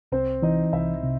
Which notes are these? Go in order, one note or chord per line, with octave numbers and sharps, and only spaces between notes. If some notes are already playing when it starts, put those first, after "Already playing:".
C2 C4 C5
E3 D#4 D#5
C2 E4 E5
C3